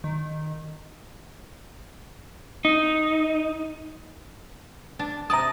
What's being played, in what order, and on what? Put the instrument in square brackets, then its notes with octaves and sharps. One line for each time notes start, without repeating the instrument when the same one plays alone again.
[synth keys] D#3
[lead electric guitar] D#4
[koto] D4 A5
[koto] C3 D5 A5 [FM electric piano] A#5 D#6